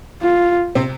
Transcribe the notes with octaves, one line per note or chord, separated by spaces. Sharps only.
F4
C3 C4